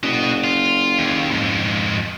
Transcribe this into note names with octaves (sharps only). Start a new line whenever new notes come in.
F#1 F#4 D#5
F4
D#2
F2 G#2